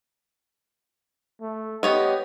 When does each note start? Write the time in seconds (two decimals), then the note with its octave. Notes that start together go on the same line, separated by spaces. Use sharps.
1.41 A3
1.83 B3 G4 C#5 D#5